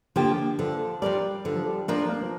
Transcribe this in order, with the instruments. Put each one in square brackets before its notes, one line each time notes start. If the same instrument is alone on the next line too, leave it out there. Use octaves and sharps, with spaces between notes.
[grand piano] D3 [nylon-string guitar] F3 A#3 G4
[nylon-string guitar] D3 [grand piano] F3
[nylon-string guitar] F3 D4 A#4 D5 [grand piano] G3
[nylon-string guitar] D3 [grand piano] F3
[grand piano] F3
G3
[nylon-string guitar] F3 D4 A#4 D5 [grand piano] A#3
[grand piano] A#3
F3